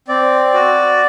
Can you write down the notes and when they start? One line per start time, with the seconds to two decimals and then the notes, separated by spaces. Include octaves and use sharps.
0.08 C4 D5
0.54 F#4